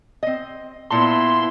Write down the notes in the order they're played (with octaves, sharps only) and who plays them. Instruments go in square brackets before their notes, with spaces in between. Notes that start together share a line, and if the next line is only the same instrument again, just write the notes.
[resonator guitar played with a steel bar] C4 D#5
[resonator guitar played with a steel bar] A#2 A5 [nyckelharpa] B3 E4 [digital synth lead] C6